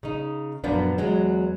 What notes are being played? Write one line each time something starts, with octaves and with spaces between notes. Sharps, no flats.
C#3 D#4
F#2 A#2 F3 A#3 B3 D4
E2 F#3 G#3